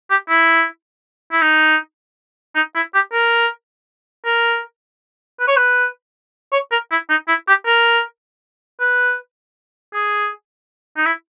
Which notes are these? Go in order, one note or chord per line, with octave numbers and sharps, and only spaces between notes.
G4
E4
E4
D#4
D#4
E4
G4
A#4
A#4
B4
C#5
B4
C#5
A#4
E4
D#4
E4
G4
A#4
B4
G#4
D#4
E4